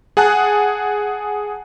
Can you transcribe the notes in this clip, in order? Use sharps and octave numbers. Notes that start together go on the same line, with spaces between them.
G#4 F#5 G#5 A5 F#6